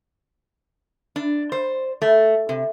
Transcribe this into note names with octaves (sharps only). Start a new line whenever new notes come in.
D4
C5
A3
C3